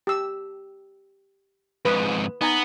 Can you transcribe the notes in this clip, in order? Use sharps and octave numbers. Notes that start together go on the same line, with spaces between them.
G4 E6
F2 G#2 B4 D#6
B3 D#4 G#5 A#5